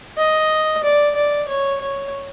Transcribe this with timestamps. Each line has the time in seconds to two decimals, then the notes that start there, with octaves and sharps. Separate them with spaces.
0.18 D#5
0.84 D5
1.16 D5
1.48 C#5
1.81 C#5